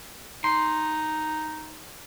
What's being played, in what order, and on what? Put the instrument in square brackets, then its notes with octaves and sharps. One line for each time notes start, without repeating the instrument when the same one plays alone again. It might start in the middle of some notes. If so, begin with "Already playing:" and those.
[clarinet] D#4 [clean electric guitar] C6